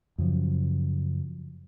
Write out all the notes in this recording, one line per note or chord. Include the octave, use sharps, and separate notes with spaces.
F#2 C#3 F3